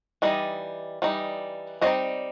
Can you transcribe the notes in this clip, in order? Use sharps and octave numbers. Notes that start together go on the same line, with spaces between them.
E3 G3 D#4 D#5
E3 G3 D#4
G3 C4 D#4 D#5